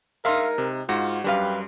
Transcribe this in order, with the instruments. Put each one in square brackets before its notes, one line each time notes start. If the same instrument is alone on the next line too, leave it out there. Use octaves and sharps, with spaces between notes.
[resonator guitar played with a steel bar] G#3 D#4 [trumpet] A#4 [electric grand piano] E5 F5 C6
[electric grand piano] C3
[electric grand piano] G#2 [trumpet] F4 [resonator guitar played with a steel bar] F#4
[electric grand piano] F#2 G3 [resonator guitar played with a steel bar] D4 B4 F5 [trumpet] G4